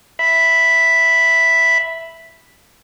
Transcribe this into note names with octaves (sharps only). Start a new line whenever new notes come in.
E5 B5